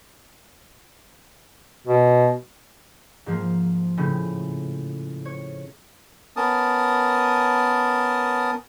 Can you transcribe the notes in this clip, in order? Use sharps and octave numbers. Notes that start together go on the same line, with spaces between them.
B2
G#2 F3 A#3
A2 C#3
C#5
B3 C#4 A#4 A5 D#6